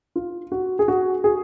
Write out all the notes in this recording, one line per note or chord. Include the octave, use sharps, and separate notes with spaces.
F4
F#4
G#4
F#4
G#4